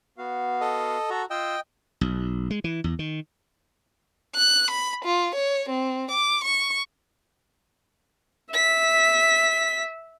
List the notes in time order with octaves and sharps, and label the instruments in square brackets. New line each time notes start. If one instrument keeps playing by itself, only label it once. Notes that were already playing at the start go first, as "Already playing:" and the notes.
[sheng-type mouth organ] B3 F#4 F5
[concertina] A4 D#5
[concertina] F#4 [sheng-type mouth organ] A4 A#5
[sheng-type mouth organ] F4 E6 [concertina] D#5 G5
[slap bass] B1
G#3
E3
E2
D#3
[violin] F#6
B5
F4
C#5
C4
D6
C#6
[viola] E5 [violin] B6